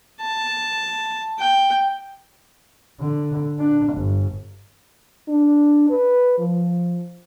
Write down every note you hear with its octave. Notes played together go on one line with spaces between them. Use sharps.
A5
G5
D3
D4
G1
D4
B4
F3